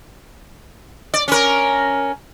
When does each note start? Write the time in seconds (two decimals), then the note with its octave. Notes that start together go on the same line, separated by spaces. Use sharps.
1.14 D5
1.28 C#4 A#4